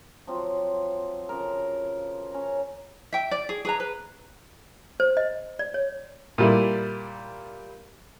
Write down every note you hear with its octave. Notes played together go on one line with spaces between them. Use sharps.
F3 F#3 C4 F4
C#3 F3 A4 A#4
C#4 A#5
E5 G5
D5
G#4
G#4 B4 A#5
B4
C5
D#5
D5
C#5
A#2 G3 E4